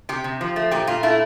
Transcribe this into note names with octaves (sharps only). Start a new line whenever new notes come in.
C3 G4
C3
F3
A3
A#2 G4
A#2 F4
A3 E4